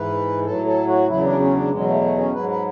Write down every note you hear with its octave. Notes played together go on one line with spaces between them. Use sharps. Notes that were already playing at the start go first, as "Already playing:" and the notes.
Already playing: G#2 E3 B4
A2 F#3 A4
A4
F#4
E2 C#3 F#3 E4
D4
C#4
D4
E2 B2 F#3 G#3
A3
A3
C#4
G#2 F#3 B4
B4